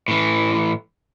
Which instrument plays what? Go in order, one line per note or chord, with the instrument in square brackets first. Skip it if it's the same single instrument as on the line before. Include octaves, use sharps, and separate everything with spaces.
[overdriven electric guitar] A2 E3